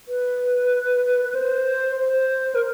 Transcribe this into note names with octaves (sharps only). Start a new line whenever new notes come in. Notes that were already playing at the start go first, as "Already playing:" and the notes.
B4
B4
C5
C5
A#4